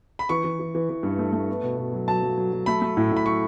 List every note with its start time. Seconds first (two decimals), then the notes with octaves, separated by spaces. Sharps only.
0.19 B5
0.29 E3 C#6
0.44 E3
0.59 E3
0.75 E3
0.89 E3
1.03 G2
1.19 A3
1.33 A3
1.48 B3
1.63 B2
1.77 B2
1.93 F#3
2.08 F#3 A5
2.23 F#3
2.38 F#3
2.52 F#3
2.66 A3 B5
2.82 A3
2.97 A2
3.12 A2 B5
3.26 F#3 C#6